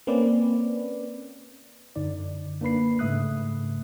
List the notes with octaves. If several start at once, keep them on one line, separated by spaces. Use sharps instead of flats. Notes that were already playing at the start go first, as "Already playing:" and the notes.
A#3 C4 C#4 B4 D5
F#2 D3 D#4 D5
A#3 D4 B4 B5 C7
G#2 C#3 A3 E5 D#6 F#6